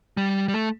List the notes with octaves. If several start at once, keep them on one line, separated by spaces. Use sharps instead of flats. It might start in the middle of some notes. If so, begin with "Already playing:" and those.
G3
G3
A3